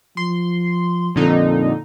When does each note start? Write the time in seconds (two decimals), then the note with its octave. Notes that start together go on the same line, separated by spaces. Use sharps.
0.17 F3 C6
1.16 F2 A#2 D3 D#4